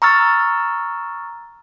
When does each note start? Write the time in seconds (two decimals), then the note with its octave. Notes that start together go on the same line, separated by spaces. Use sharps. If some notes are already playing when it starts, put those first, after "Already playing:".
0.02 A#5 C#6 E6 F6 A6